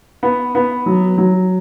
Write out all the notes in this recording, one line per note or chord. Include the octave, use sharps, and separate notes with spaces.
B3
B3
F#3
F#3